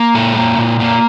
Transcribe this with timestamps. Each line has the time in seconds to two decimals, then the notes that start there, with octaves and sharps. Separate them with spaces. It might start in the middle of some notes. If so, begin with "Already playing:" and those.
Already playing: A#3
0.15 A#2 A4
0.36 A#3
0.58 A#2
0.80 A#3